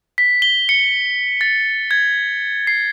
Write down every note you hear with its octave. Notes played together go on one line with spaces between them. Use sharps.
B6
G7
C#7
A6
G#6
C7